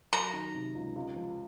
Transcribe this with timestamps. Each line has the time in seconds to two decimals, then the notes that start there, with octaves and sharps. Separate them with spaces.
0.12 F#3 A#5
0.33 D#3
0.55 C3
0.75 C#2
0.96 C#2
1.16 F3